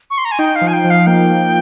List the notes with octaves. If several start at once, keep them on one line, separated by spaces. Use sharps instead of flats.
C#6
C6
A#5
G#5
D#4 G5
F5
F3
G#5
G5
F3
F5
A#3 G5
A#3